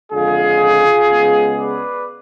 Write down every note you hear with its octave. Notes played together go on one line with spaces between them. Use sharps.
F2 D3 G#3 F4 G#4
C#3 G#3 B3
B4 D5